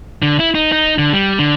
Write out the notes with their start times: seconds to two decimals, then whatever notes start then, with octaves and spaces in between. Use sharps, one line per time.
0.22 D3
0.39 E4
0.55 D#4
0.72 D#4
0.98 D3
1.13 G3
1.39 D3